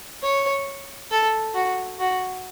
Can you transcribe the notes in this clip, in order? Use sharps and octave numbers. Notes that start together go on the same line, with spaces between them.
C#5
A4
F#4
F#4